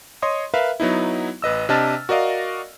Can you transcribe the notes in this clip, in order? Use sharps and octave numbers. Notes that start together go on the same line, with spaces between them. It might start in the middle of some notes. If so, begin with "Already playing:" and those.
C#5 D#5 C6 D#6
A#4 B4 E5 F5
F#3 B3 D#4 E4
A1 B4 D#5 E6
C3 D4 D#5 A5 F6 A6
F#4 A#4 D5 D#5 F5